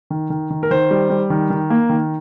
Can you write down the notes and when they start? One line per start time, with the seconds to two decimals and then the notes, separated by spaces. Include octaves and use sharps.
0.10 D#3
0.30 D#3
0.50 D#3
0.63 A#4
0.71 D#3 C5
0.91 G3
1.10 G3
1.30 D#3
1.50 D#3
1.70 A#3
1.89 D#3